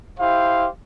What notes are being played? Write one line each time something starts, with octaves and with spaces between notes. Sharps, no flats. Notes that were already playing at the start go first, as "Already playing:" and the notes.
E4 G4 C5 F5